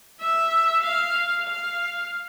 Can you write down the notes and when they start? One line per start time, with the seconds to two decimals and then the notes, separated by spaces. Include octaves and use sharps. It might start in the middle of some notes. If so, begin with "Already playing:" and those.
0.20 E5
0.83 F5
1.46 F5